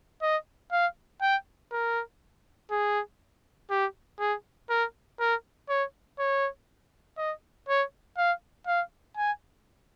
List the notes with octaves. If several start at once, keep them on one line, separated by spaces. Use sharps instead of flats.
D#5
F5
G5
A#4
G#4
G4
G#4
A#4
A#4
C#5
C#5
D#5
C#5
F5
F5
G#5